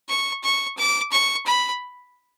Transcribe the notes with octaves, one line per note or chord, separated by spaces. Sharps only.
C#6
C#6
D6
C#6
B5